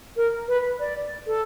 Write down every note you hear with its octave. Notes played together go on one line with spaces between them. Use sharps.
A#4
B4
D5
A4